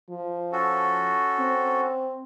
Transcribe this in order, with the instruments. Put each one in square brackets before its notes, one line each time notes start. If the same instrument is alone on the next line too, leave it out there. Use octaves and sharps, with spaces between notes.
[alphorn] F3
[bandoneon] C#4 F#4 A4
[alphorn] C4